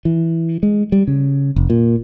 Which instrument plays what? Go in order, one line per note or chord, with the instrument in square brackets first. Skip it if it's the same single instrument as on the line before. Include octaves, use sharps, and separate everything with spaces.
[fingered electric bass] E3
G#3
G3
C#3
F1
A#2